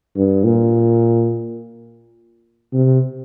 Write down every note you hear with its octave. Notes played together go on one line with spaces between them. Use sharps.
G2
A#2
C3